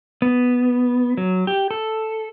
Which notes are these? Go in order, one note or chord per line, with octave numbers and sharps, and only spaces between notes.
B3
F#3
G4
A4